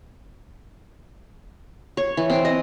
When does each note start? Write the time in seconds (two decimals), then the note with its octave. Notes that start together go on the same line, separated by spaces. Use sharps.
1.97 C#5
2.17 E3
2.30 C4
2.45 D#5